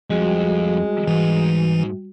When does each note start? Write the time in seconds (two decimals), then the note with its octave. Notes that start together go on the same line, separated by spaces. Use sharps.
0.10 F2 G3 G#3 F#4
1.07 G#2 E3